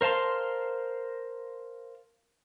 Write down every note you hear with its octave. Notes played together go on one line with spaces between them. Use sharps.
A#4 C5 F5 A5 C6